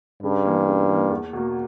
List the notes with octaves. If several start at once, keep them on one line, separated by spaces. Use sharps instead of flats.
G2 C#3
E3 A#3
C#3
E3 A#3
E2
B2 A#3